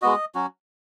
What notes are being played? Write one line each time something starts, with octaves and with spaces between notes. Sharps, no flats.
G#3 B3 F#4 D#5
F#3 C#4 F#4